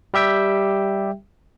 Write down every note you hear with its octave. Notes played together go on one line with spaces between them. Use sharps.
G3 G4 E5 G5